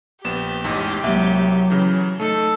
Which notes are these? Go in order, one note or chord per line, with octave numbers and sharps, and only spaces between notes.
A#1 B3 G4 E7
A1 E2 G#2 G#3
C2 F#3 G#3 A#3 E5
C#3 E3
A3 D#4 A4